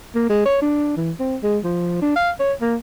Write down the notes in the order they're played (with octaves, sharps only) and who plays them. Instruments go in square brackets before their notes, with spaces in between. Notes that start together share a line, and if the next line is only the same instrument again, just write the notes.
[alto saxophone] A#3
G#3
C#5
D4
E3
C4
G#3
F3
D4
F5
C#5
A#3